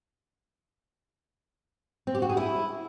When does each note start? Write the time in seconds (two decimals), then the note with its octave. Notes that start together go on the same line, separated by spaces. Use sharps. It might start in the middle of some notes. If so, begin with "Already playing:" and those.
2.07 C4
2.15 G4
2.22 F#4
2.29 G#4
2.37 E4